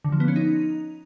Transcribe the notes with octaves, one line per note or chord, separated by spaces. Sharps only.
D3
F3
B3
C#4
D#4